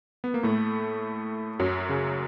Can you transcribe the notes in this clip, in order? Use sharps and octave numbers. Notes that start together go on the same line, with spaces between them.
B3
A#3
A2 A3
F#2 F#3
C#3